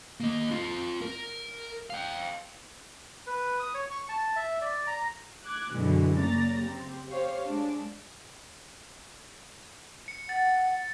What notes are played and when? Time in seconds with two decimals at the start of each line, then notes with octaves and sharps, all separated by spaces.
0.20 A#3 D#5
0.51 C4 F4
1.01 A#4
1.90 F5 G5
3.27 B4
3.60 D#6
3.74 C#5
3.91 C#6
4.09 A5
4.36 E5
4.62 D5
4.87 A#5
5.43 D6 F#6 G#6
5.72 F#2 B2 D3 E3 F#3 G#3
6.17 C#3 A#3 D5 A#5 A6
6.62 C4 G4
7.09 G4 C5 C#5 F5
7.46 G#3 D4
10.08 C#7
10.29 F#5 A6